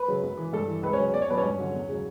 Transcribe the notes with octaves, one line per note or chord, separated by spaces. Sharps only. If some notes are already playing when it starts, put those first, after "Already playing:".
Already playing: B4
C#3 F#3
F#2
E3
G2 A4
E3
C#2 B4
C#4 C#5
C#3 F#3
E2 D5
C#5
B2 F#3 B4
C#4 C#5
G2
D3 F#3
E2
C#3 F#3